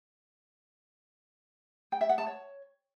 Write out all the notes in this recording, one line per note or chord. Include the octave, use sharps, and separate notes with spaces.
G5
E5
F#5
A5
C#5